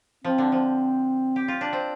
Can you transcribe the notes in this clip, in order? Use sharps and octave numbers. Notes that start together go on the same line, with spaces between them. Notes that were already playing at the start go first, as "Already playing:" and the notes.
F3 C4
D3
F3
G4
F4
D4
C4